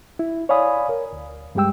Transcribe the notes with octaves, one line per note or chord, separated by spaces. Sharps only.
E4
C#5 D5 F5 G#5 B5 D#6
A#4
D2
G2 G3 G#3 G4 G5 E6